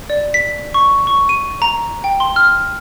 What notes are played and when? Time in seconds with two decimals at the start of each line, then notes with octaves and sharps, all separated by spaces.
0.10 D5
0.34 B6
0.74 C#6
1.07 C#6
1.29 D#7
1.62 A#5
2.04 G5
2.20 C6
2.36 F6